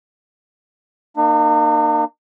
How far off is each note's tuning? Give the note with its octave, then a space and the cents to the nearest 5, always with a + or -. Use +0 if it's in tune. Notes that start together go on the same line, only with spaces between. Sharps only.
A#3 -10 D#4 -45